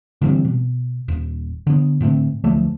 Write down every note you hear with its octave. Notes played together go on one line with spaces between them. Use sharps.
D3 E3 G3 C4
B2
D#1
D3 B3
A2 D3 A3 C4
D2 F3 F#3 A3